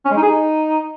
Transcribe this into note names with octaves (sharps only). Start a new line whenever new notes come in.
C#4
G#3
D#4
G#4
D#4